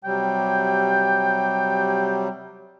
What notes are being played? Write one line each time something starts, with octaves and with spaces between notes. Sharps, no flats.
C3 F#3 G3 G5